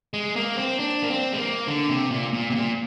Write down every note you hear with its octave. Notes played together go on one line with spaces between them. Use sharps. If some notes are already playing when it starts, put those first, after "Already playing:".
G#3
A#3
C4
D4
A#3
C4
G#3
A#3
D3
C3
A#2
A#2
C3
A#2